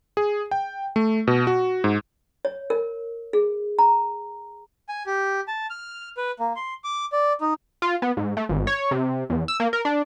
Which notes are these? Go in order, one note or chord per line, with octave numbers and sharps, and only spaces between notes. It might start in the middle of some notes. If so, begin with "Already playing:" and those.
G#4
G5
A3
B2
F#4
G#2
C#5
A#4
G#4
A#5
G#5
G4
A5
F6
B4
A#3
C6
D6
D5
D#4
F4
B3
G#2
A3
G#1
C#5
C3
E2
E6
A#3
A#4
D4